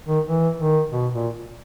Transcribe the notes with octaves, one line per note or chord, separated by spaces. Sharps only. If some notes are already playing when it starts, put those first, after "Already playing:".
D#3
E3
D#3
B2
A#2